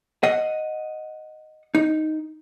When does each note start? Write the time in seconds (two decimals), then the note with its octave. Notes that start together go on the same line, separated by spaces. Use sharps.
0.23 D#5 F#5
1.75 D#4